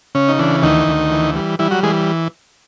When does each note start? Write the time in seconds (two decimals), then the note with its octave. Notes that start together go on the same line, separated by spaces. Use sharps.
0.15 C#3 C#4
0.28 D#4
0.39 E3 D4
0.63 D2 D#3 D#4
0.87 D2
1.12 E3
1.36 G3
1.59 E3 G3 E4
1.71 F#3 F#4
1.83 E3 G#3 G#4